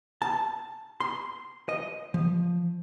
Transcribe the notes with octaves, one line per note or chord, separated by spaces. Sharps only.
A5
C6
D#5
F3